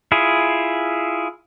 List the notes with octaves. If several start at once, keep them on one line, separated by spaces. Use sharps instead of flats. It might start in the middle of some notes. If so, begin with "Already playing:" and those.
E4 F4 G#4